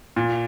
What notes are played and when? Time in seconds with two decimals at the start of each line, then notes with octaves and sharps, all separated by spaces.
0.16 A#2